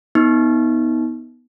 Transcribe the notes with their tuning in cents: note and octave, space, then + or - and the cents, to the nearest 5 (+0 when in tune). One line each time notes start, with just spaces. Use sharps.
B3 +0 D#4 +25